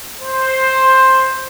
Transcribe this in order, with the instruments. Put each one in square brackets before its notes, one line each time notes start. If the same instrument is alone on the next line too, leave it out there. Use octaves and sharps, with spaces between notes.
[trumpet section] C5